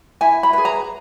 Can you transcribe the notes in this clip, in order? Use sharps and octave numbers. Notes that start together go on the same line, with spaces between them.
E4 G#5
B5
G#4 B4
A#5